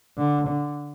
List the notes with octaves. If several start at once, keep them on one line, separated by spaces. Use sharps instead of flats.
D3
D3